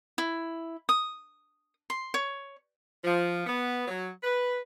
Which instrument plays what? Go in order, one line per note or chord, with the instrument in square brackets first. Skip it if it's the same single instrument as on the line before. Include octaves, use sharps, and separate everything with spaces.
[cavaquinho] E4
D#6
C6
C#5
[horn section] F3
B3
F#3
B4